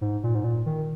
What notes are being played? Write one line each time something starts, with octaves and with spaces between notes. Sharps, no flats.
G#2
A#2
G#2
A#2
D#3